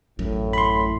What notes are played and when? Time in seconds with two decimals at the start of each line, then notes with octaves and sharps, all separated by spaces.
0.19 A1 F#2 A2
0.53 B5 C6